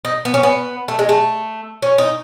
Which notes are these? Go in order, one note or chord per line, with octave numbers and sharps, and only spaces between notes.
D#4
B3
C#4
B3
A3
G#3
A3
C#4
D#4